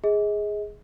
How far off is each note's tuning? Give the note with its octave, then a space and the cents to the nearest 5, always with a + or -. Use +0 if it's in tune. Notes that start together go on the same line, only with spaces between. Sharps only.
G#4 +0 D#5 +35